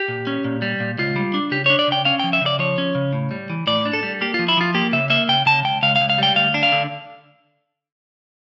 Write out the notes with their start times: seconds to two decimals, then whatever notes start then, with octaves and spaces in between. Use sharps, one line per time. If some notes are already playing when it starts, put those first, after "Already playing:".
Already playing: G4
0.08 A#2
0.27 C#4
0.44 A#2
0.62 G3
0.80 A#2
0.98 C#2 F4
1.16 G3
1.34 D4
1.51 C#3 G4
1.66 D4 C#5
1.79 D5
1.88 C#3 G5
2.05 C#4 F5
2.19 F3 G5
2.33 E5
2.41 C#3 D5
2.59 F3 C#5
2.78 C#4
2.95 C#3
3.13 A2
3.31 G3
3.50 E3
3.67 A2 D5
3.85 D4
3.93 A4
4.03 G3
4.21 A#3 G4
4.34 F4
4.39 F3
4.48 E4
4.57 F3 F4
4.74 A#3 G4
4.93 C#3 E5
5.10 A#3 E5
5.28 C#3 G5
5.46 C#3 A5
5.64 C#2 G5
5.83 C#2 F5
5.96 F5
6.00 C#2
6.10 F5
6.18 G3 G5
6.35 D2 F5
6.54 D4
6.63 F5
6.72 D3